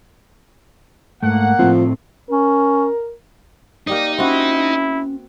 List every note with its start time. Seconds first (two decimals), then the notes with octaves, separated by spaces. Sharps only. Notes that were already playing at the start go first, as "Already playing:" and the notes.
1.23 G#2 A3 A#3 F#5
1.59 A2 F3 A3 C4
2.30 C#4 A#4
3.87 A#3 D#4 G4 D5 D#5
4.18 C4 C#4 E4 F#4